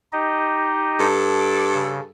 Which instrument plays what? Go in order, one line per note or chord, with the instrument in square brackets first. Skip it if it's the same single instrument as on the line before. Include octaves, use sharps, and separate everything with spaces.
[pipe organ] D#4 G4 D#5
[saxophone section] G2 A4
[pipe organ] D6
C#3